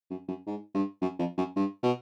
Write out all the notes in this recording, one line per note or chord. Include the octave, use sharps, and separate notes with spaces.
F#2
F#2
G#2
G2
F#2
F2
F#2
G2
B2